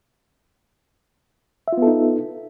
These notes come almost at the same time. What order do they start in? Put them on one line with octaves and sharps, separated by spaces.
E5 F4 B3 A4 D#4